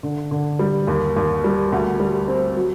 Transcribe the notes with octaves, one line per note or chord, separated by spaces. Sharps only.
D3
D3
G3
D#2
D#2
G3
D2
G3
C4
F#3